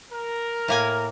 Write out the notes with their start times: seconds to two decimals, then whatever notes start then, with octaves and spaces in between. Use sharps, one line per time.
0.13 A#4
0.68 A2 A#3 G#5